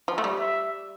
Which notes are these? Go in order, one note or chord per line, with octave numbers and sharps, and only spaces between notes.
F3
A3
G3
E5